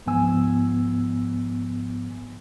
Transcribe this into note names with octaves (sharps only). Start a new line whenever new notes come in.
C#2 G#2 F3 B3 G#5 E6